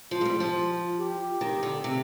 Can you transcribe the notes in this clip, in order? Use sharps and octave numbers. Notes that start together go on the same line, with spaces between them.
F3 F4
G#3
G3
F3
G4
D#3
D3
C3